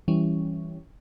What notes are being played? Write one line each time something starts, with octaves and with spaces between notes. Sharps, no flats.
E3 G3 C#4